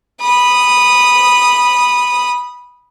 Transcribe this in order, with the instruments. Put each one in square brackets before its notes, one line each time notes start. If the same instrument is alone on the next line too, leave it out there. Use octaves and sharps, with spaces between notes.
[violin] B5 D#6